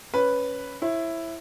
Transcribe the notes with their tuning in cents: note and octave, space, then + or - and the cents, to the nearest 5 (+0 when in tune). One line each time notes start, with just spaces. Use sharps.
C#4 +0 B4 +0
E4 +5 C#5 -45